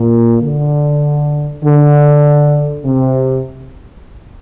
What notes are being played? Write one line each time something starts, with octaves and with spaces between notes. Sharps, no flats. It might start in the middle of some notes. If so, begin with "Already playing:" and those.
Already playing: A#2
D3
D3
C3